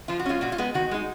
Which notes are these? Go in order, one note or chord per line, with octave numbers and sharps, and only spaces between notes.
F3 F4
F#4
G#3 C#4 F4
A#2 F#4
F4
G#3 B3
D#3 F#4
G#3 D#4